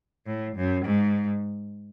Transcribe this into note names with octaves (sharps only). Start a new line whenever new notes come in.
A2
F#2
G#2